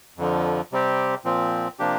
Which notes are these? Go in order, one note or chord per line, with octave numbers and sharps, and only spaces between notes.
F2 D3 F3
C3 G3 C4 G4
A#2 F3 C4
C3 F3 A#3 D4 G4